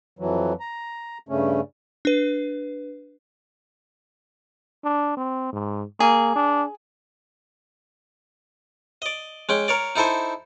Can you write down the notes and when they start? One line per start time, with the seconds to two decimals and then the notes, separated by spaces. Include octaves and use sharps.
0.19 F2 E3 F#3
0.60 A#5
1.29 G2 C#3 A3 C#4
2.05 D4 B4
4.84 D4
5.17 C4
5.53 G#2
6.00 A#3 G#4
6.36 D4
9.02 D5 D#5
9.49 G#3 C#4 G5
9.68 A#4 C#5 D5
9.96 D#4 E4 A4 C5 G#5